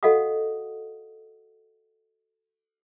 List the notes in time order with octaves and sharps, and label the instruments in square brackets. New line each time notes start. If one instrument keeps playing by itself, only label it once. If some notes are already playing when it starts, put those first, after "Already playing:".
[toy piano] F#4 A4 D#5 F5 F#5 D#6